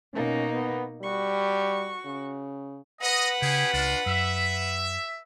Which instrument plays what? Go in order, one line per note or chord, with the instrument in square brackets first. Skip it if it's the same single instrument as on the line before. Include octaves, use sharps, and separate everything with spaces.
[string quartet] B2 A#3 D#4 [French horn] C#4
[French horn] B3
[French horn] G3 [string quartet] F#4 C#6
[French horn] C#3
[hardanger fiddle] B4 F#5 [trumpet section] D#5
[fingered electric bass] C#3 [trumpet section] C#4 G4 G#4
[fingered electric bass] C#2 [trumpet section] D4 F4
[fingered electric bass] F#2 [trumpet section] E5